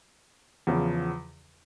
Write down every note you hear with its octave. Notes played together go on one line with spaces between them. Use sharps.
E2 C#3 F3